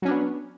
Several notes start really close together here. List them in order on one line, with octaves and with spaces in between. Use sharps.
F#3 C#4 D4 B3